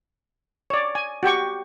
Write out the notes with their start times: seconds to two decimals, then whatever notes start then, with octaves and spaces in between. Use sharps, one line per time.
0.70 C#5 D5
0.95 G#5
1.23 F#4 G4 G5 C#6